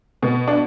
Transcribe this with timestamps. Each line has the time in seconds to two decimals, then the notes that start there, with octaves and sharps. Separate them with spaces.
0.22 B2
0.48 D4